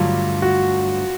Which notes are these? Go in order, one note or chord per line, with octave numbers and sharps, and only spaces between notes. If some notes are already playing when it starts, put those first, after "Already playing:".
Already playing: G2 D3 F#3 A3 F4
F#4